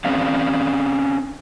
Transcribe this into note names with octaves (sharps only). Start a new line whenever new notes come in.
C4 C#4 D5 F5